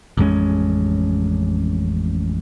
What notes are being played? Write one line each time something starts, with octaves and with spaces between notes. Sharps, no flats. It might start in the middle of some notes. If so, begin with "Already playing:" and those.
A1 F2 G#3 C#4